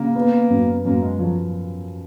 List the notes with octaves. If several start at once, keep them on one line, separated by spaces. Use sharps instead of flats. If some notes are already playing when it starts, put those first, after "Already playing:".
Already playing: C#3 A#3
B3
F#2
F#2 A#3
G#3
F3 F#3